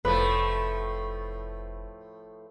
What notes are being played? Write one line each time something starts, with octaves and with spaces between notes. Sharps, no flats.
F1 A2 F3 A3 B4